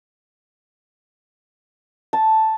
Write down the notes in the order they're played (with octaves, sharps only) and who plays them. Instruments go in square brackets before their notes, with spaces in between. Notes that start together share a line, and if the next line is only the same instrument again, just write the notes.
[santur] A5